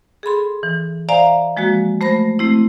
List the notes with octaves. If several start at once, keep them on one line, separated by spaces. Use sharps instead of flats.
G#4 A4 B5 C6
E3
C5 D5 E5 F5 G#5 A#5
F3 G#3 A#3 F#4
A3 C5 B5 A#6
A3 C4 E4